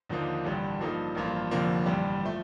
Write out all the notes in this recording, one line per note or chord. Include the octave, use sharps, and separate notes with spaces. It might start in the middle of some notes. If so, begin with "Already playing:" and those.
D#2 D3 F3 A#3 D#4
A1 G2 D3 G3
G2 F3 A#3 D#4 A4
A1 G2 F3 A#3 F4
F1 F2 D3 F3 A#3
A1 G2 D3 G3
F3 A3